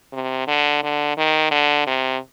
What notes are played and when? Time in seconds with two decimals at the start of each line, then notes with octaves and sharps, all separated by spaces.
0.13 C3
0.47 D3
0.83 D3
1.17 D#3
1.51 D3
1.87 C3